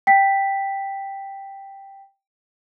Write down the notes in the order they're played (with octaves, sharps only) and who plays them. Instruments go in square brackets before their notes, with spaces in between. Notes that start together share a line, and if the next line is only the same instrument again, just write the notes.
[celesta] G5 B6